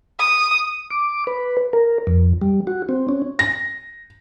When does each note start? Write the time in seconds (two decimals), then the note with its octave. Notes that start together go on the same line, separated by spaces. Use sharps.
0.19 D#6
0.91 D6
1.27 B4
1.73 A#4
2.07 F2
2.41 G3
2.67 F#4
2.89 C4
3.09 C#4
3.39 A#6